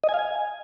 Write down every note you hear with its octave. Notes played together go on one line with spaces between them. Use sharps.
D#5
G#5
F5
G#5